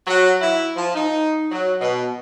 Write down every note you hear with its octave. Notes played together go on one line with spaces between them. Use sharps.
F#3
E4
F3
D#4
F#3
B2